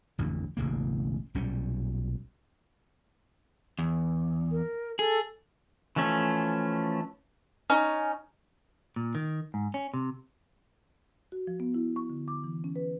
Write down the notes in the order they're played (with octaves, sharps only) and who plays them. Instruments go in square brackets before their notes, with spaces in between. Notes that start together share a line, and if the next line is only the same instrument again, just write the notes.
[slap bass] A1 F2 D3
E1 A1 C#3 A#3
B1 A#2 G3 C#4
[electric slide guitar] E2
[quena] A#4
[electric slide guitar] G#4 [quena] A4
[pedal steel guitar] E3 F3 A3 C#4
[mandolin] C#4 [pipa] D#4
[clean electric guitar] A#2
D#3
G#2
C#4
C3
[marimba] F#4
F3
B3
E4
C#6
D3
D6
E3
C#4
B4